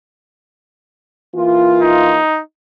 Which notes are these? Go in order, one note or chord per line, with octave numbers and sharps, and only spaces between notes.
E3 A#3 F4
D#4